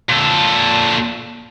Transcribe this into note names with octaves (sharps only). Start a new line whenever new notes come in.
A#2 A4